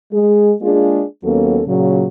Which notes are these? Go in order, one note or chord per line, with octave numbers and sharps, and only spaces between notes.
G#3 G#4
G#3 A#3 D4 F4 G#4
D#2 F#3 A#3 B3 C#4 A4
A#2 C#3 F#3